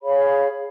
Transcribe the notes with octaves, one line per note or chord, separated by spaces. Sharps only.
G#4 C#5 F5 B5